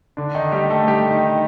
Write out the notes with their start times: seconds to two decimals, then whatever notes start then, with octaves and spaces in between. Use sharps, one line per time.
0.17 D3 D4
0.35 D#3 D#4
0.52 G3 G4
0.70 A3 A4
0.88 G3 G4
1.10 D#3 D#4